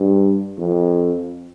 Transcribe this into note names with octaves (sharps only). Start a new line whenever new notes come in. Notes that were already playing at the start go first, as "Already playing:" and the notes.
Already playing: G2
F2